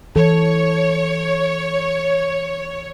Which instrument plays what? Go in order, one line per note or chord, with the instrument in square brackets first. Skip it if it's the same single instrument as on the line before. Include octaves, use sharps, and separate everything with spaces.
[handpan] E3 A4 [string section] C#5